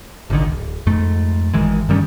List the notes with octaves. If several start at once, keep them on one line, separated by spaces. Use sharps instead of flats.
G#1 C#2 D3 D#3
D1
F2 G#2 A3
G#1 D#3 E3 G#3
G2 D#3 G3 C#4